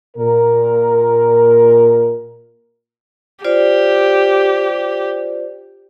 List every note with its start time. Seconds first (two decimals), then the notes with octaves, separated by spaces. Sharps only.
0.17 A#2 A#4
3.44 F4 G4 C5 D5